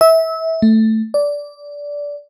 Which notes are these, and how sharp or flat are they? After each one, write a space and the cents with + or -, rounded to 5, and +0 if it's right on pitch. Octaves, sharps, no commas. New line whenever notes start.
E5 -25
A3 +5
D5 -15